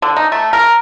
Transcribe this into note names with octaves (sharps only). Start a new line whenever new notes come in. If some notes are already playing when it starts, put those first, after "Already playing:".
D3
D#4
A3
A#4